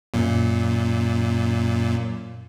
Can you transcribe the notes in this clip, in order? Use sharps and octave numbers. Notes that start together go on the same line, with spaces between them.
F#2 A#2